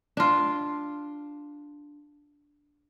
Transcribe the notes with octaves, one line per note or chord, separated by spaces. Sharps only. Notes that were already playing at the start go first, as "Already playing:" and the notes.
D4 F4